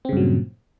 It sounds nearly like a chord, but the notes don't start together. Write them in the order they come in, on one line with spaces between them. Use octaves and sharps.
C4 C#3 G2 F#3 A#2